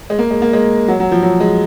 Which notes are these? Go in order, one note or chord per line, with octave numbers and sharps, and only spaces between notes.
G#3
A#3
G#3
A#3
G#3
F#3
F#3
F3
F#3
G#3